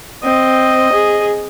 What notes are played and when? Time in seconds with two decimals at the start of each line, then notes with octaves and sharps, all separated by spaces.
0.24 C4 D#5
0.93 G#4